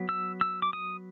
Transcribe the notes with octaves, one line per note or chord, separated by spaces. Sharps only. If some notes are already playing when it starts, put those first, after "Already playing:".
Already playing: F#3 B3
E6
E6
D6
D#6